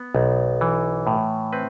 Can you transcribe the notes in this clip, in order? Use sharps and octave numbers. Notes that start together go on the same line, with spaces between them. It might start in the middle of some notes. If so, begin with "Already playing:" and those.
Already playing: B3
B1
E3
A2
C4 B4